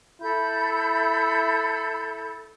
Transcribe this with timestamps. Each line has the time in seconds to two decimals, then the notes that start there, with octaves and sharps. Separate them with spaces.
0.21 E4 A4 B5 G6